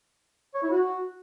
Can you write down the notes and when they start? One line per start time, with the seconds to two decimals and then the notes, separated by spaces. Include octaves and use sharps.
0.54 C#5
0.63 E4
0.71 F#4